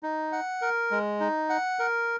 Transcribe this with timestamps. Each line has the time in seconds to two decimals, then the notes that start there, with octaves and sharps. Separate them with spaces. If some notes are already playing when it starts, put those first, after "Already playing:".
0.03 D#4
0.32 F#5
0.62 A#4
0.91 G#3
1.20 D#4
1.50 F#5
1.79 A#4